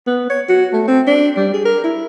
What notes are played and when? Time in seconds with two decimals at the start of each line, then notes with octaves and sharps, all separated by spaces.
0.07 B3
0.30 C#5
0.49 F#4
0.73 A3
0.88 C4
1.07 D4
1.37 G3
1.54 G#4
1.65 A#4
1.84 E4